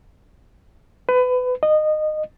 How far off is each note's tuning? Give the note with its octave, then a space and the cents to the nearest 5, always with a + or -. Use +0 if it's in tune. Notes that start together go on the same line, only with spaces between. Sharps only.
B4 +25
D#5 -20